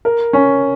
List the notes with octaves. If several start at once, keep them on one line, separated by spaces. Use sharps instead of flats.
A#4
C#4